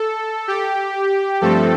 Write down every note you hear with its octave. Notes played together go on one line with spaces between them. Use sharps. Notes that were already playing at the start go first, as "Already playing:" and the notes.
Already playing: A4
G4
G2 F3 A3 C4 A4